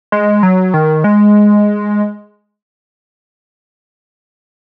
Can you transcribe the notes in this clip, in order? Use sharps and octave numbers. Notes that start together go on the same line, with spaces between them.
G#3
F#3
D#3
G#3